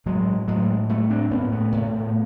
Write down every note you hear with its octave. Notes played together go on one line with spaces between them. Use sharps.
A2 F#3 G#3
A2 F#3 G#3
A2 G3 A3
C4 D4
A2 B3 C#4
A3 B3
A2